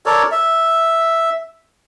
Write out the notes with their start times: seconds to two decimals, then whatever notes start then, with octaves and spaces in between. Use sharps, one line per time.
0.06 A4 A#4 C#5 D5
0.32 E5